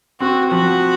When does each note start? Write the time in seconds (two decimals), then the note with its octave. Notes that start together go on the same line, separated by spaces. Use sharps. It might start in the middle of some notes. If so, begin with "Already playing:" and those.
0.20 C4 F#4
0.51 F3 F#4